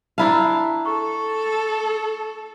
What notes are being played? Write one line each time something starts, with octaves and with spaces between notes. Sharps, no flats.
D4 E4 F5 A5 A#5
A4 C#6